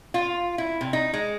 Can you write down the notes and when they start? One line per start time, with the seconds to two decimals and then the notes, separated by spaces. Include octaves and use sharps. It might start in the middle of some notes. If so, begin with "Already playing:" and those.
0.14 F4
0.58 E4
0.81 C3
0.93 D#4
1.14 G#3